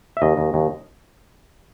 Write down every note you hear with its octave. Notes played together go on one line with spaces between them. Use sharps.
E5
D#2 D#5
D#2
D#2